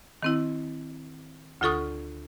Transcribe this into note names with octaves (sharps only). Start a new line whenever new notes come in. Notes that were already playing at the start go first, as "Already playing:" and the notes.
D#3 C4 E4
D2 D3 F4 A4 C#6 D#6